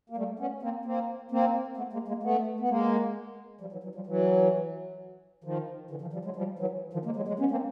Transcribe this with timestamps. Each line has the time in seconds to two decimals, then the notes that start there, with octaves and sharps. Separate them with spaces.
0.10 A#3
0.17 G3 A3
0.39 B3 C#4
0.62 A#3 C4
0.85 A#3 C4
1.31 A#3 C4
1.77 A3 B3
1.93 G#3 A#3
2.08 G#3 A#3
2.23 A3 B3
2.60 B3
2.69 G#3 A#3
3.61 F3 G3
3.72 E3 F#3
3.83 E3 F#3
3.95 F3 G3
4.07 E3 F#3
5.44 D#3 F3
5.91 D3 E3
6.01 D#3 F3
6.13 F3 G3
6.25 F#3 G#3
6.36 F3 G3
6.59 E3 F#3
6.93 D#3 F3
7.05 G#3 A#3
7.16 F#3 G#3
7.28 F#3 G#3
7.39 B3 C#4
7.51 A#3 C4